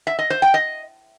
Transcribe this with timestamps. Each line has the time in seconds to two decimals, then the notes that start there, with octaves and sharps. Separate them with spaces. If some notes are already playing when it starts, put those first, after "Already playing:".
0.07 E5
0.19 D#5
0.30 C5
0.42 G5
0.54 D#5